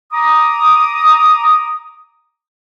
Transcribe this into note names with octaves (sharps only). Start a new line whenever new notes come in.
A#5 D6 D#6